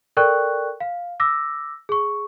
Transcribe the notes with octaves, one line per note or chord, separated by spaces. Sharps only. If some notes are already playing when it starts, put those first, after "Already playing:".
A4 A#4 D5 G5 C#6 F#6
F5
D6 E6 A#6
G#4 C#6